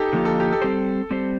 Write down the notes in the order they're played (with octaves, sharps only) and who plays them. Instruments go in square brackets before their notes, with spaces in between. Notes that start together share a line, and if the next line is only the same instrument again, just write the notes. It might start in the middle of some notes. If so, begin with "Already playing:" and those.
Already playing: [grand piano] D#4 G4 A4
[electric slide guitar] D3 F3 A#3 F4
[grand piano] A4
G4
A4
[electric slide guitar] G3 C4 G4 C5
G3 C4 G4 C5